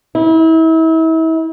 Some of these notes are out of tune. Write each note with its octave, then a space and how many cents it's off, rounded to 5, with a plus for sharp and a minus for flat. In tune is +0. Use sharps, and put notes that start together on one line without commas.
E4 -35